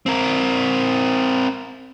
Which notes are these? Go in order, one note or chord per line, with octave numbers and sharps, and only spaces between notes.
C4 A#4